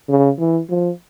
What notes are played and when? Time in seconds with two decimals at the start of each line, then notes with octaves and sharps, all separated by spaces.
0.09 C#3
0.40 E3
0.69 F3